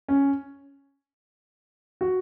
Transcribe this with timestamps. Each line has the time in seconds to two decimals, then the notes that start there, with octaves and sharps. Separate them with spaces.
0.08 C#4
2.01 F#4